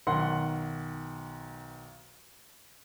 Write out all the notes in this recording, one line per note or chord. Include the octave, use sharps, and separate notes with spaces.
B1 D#3 F#5 C6